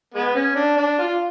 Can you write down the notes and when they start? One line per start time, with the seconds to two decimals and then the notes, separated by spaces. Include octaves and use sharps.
0.14 G#3 B3
0.35 C#4
0.56 D4
0.77 D4
0.98 F4